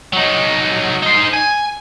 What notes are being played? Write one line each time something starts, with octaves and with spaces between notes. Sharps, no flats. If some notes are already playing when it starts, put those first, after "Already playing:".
F#3 D#4
D#4 C5
G#5